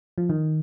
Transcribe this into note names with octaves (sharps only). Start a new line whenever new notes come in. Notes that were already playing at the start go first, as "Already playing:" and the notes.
F3
D#3